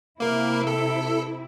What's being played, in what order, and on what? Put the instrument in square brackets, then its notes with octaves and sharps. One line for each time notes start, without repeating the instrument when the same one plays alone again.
[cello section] C3 E4 [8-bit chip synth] A#3 A#4
[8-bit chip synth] A4